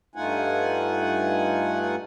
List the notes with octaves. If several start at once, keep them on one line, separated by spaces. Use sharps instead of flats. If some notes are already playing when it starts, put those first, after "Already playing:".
G2 A3 D#4 F4 F#5 G#5